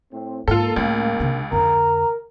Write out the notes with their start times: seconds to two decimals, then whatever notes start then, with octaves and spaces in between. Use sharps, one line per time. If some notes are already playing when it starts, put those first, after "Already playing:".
0.13 A2 C4
0.48 G#2 A#3 F4 A4
0.76 C#2 A2
1.20 C3 D4
1.52 F2 D3 A#4 A#5